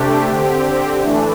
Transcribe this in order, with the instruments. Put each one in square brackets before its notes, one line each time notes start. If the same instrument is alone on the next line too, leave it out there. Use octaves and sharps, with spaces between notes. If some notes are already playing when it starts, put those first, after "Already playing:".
Already playing: [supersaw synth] C3 A3 D4 G4
D3 C4 G4
E3 A3 D4